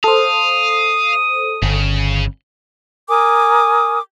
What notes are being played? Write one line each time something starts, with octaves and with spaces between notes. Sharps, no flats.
A4 C5 F5 D#6
G1 C#3
A#4 G#5 D6 D#6